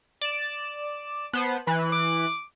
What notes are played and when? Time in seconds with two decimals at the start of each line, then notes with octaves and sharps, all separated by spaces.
0.21 D5 E7
1.33 B3 C5 A5 F#6
1.67 E3 B4 F#6
1.92 D6